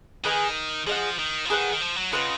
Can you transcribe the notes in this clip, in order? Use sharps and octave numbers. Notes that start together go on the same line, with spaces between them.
D#3 G#4 B4 D#5 G#5
F3 G#4 D#5 F#5
D#3
F3
D#3 G#4 B4 F#5
D#3
F3
F#3
C#3 F4 B4 D#5 F#5